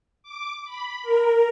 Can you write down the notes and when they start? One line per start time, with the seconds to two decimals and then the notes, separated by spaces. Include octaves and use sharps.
0.23 D6
0.65 B5
1.02 A#4